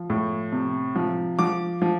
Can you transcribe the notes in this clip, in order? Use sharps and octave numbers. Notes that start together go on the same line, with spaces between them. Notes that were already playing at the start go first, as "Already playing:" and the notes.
Already playing: F3
A2
C3
F3
F3 D6
F3